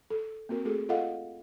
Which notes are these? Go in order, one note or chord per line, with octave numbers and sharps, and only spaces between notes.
A4
A#3 C4 F#4 A#4
A3 F#4 G#4 A4
F4 A4 D#5 F5 F#5